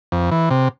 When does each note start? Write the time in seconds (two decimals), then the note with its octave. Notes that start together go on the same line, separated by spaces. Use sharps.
0.12 F2
0.31 E3
0.50 C3